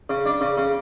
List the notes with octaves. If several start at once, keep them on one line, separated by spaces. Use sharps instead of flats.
C#3
D4
C#3
C#3